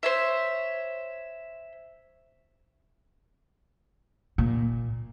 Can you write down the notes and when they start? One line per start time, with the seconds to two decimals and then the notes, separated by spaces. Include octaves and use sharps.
0.03 C5 C#5 E5
4.38 A#2